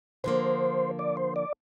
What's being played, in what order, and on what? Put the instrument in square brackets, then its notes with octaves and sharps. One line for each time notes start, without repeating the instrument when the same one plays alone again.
[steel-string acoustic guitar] D3 F3 A#3 [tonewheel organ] C5
[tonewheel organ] D5
C5
D5